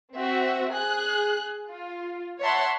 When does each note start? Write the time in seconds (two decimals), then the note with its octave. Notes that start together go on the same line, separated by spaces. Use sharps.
0.17 C4 F#4 E5
0.74 G#4 F#6
1.71 F4
2.41 C#5 E5 F#5 A5 B5 C6